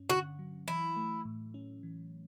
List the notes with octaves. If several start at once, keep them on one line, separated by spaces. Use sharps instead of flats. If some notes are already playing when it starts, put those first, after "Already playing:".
Already playing: G2 C#4
D3 F#4
F#3
E3 E4
A3
A2
C#4
E3